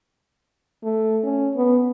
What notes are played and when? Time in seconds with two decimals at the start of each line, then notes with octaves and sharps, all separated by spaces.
0.83 A3
1.23 C#4
1.56 B3